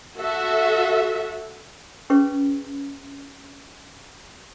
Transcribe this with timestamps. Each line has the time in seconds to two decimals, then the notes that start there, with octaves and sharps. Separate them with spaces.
0.18 F#4 A4 E5
2.10 C#4 G#4 B4 C#6